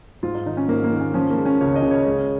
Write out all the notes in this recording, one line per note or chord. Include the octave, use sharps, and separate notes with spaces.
G#2 F4
D#4
D#3 D#4
C#4
G#2 A#3
A#3
D#3
C#4
F3 C#4
A#3
G#3
C#4
C#2 C#5
D#5
C#3
C#5
G#3